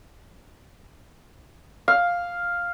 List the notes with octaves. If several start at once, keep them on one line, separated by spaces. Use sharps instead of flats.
F5